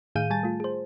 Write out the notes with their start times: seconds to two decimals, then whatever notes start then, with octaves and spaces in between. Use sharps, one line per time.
0.15 A2 D#3 G#4 F5 G6 D#7
0.30 G3 G#5 A5 A6
0.43 A3 F4
0.60 G#4 C5